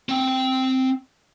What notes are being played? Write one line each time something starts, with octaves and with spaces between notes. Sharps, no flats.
C4 G5